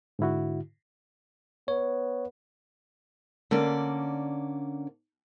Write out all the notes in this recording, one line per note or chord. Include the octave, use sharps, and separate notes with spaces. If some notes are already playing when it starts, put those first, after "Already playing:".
G#2 D3 E4 F#4
B3 C#5
D3 A#3 C#4 D5